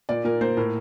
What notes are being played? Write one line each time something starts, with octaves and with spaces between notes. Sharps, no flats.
A#2 D5
A#2 A#4
A#3 C5
A2 A#4